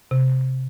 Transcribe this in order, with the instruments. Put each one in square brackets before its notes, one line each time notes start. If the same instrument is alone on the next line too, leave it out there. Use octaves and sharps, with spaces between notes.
[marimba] C3